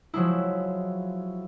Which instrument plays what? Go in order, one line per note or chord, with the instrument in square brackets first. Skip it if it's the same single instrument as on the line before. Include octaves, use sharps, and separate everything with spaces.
[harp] F3 F#3 G#3 E4